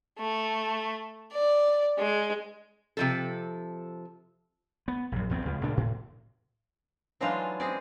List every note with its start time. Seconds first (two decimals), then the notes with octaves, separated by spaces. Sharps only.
0.19 A3
1.33 D5
1.98 G#3
2.97 C3 F3 A4
4.88 B3
5.12 A#1 F#2
5.30 A#1 E2 B3 C4
5.45 C#2
5.61 C#2 A#2 D4
5.77 A2
7.20 E3 F#3 G#3 D4 D#4 F4
7.60 G#3 C4 C#4 G#4 D5